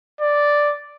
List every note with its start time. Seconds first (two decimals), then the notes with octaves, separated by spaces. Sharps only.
0.21 D5